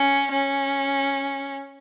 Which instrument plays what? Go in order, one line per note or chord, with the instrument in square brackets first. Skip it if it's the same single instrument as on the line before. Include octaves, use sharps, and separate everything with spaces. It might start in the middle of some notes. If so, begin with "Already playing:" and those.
Already playing: [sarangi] C#4
C#4